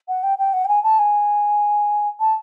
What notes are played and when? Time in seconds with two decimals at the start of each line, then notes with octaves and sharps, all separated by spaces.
0.08 F#5
0.23 G5
0.38 G5
0.53 F#5
0.65 G5
0.68 G#5
0.84 A5
0.99 G#5
2.20 A5